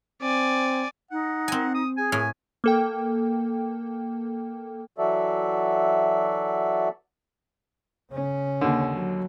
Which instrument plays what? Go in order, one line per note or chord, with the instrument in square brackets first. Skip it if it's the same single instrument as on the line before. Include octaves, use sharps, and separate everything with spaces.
[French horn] C4 [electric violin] D5 G#5
[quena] D#4 [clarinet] F#5
[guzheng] C4 G#5
[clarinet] D#6
[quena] G#4 [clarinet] G#5
[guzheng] A2 [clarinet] G#5
[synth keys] A#3 A4 G5
[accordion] E3 F#3 F#4 A4 D5 E5
[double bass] C#3 C#4
[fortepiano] D#2 D3
[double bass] F#3